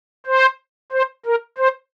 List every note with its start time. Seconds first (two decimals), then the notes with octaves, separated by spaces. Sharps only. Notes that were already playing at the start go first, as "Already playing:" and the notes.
0.26 C5
0.92 C5
1.25 A#4
1.58 C5